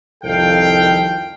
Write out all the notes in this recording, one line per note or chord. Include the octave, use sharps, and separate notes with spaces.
C2 F2 D#3 A4 F5 G5